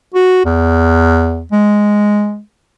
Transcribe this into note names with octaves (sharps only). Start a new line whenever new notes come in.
F#4
E2
G#3